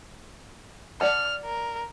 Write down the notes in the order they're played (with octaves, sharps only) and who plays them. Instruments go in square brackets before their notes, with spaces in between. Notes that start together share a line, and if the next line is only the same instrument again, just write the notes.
[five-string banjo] D5 F#5 A5 [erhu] F6
[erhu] A#4